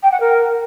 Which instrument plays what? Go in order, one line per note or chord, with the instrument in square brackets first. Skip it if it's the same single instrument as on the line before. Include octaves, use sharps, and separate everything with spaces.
[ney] G5
F#5
A#4